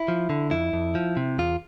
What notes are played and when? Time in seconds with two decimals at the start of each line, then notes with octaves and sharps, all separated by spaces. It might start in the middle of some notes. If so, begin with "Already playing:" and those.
Already playing: E4
0.08 F3
0.30 D3
0.51 F2 E4
0.73 F2
0.95 F3
1.17 C3
1.38 E2 F4